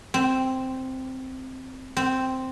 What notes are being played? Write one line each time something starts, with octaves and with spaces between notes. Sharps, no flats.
C4
C4